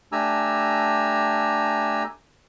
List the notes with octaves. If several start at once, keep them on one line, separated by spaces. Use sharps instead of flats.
A3 D4 G4 G#5 A#5 E6